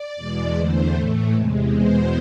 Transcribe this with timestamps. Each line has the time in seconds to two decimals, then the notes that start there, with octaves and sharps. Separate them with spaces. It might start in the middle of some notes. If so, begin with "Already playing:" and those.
Already playing: D5
0.16 E2 B2 G#3
0.55 E2 D3 A3 C5
0.93 A2 E3 A3
1.32 E2 C3 G#3
1.71 E2 B2 G#3 C5